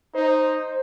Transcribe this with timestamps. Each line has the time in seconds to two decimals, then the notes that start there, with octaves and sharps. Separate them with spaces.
0.14 D#4 C5